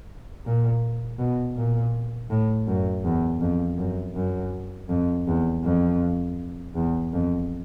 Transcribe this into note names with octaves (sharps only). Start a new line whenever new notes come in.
A#2
B2
A#2
A2
F#2
E2
F2
F#2
F#2
F2
E2
F2
E2
F2